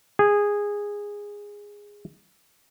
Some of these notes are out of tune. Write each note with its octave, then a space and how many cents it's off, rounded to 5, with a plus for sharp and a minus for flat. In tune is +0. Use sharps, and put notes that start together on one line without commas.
G#4 -15